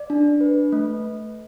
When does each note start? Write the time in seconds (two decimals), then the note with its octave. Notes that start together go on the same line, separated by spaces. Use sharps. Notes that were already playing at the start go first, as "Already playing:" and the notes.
Already playing: D5
0.10 D4
0.41 B4
0.72 A3